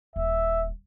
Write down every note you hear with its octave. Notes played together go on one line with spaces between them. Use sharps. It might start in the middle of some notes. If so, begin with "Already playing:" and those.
D#1 E5